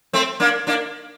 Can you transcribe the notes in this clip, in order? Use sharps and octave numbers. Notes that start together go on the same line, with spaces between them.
A3 C4
A#3 D4
A#3 D4